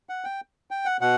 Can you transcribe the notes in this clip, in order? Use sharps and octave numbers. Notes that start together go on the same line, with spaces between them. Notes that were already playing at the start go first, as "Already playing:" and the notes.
F#5
G5
G5
F#5
B2 F#5